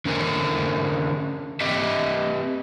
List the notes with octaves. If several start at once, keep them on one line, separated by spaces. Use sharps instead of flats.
D3 C#4 A#4 C5 G#5
C4 G4 D#5 E5 G5